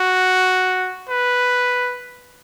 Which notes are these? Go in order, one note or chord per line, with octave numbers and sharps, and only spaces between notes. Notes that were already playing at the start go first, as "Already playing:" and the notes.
Already playing: F#4
B4